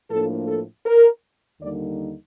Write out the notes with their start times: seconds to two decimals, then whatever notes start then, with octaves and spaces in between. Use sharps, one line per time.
0.10 A2 F3 A#3 D4 A4
0.48 A4
0.86 A#4
1.61 D#2 D3 G3 A#3 D#4 D5